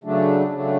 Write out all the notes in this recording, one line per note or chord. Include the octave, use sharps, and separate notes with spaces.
C#3 F#3 A3 D4
C#3 F#3 A3 D4